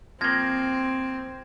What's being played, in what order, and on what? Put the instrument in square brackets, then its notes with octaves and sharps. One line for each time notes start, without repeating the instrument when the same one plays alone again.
[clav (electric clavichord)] F3 A#3 [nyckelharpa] C4 [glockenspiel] G#6 A#6